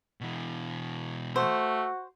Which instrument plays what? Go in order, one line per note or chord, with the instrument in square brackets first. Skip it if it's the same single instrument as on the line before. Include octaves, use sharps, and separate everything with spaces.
[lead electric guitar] B2 E3
[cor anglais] A3 [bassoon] F#4 [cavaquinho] C5